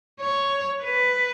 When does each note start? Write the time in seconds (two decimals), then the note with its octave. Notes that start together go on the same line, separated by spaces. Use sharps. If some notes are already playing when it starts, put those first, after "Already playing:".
0.21 C#5
0.84 B4